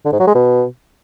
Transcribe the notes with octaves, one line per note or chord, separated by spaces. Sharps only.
D3
G#2
F#3
G#3
B2